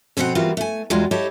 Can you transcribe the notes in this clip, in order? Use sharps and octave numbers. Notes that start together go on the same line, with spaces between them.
F2 B2 B3 C4 F4 F#5
E3 G3 A#3 C4 F4 F#4
A3 G#5
E2 G3 G#3 D#4 F4 F#4
E4 G4 A4 C#5 D#5